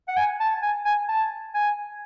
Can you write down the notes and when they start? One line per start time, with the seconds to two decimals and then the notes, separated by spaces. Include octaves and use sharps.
0.08 F#5
0.17 G#5
0.40 A5
0.62 G#5
0.85 G#5
1.08 A5
1.54 G#5